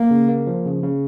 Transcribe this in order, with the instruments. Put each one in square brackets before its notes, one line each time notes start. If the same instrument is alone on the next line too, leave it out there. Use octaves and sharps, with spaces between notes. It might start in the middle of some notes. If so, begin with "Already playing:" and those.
Already playing: [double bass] A#3
[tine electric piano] C#3
A#3
F3
C#3
C#3